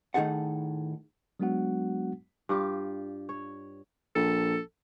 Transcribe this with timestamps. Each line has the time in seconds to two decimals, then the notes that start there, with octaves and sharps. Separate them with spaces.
0.14 A2 D#3 D#4 G#4 A4 F#5
1.40 F#3 G#3 B3 D4 F#4 F#5
2.49 G2 F4 G4
3.29 C#5
4.16 A#1 A4